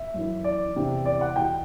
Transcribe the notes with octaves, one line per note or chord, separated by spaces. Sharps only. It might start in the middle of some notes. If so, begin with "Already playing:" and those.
Already playing: E5
F#2 E3
D5
E2 C3 E3
D5
F#5
E2 B2 G5